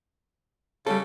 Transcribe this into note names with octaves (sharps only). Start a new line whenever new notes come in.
C#3 G3 A4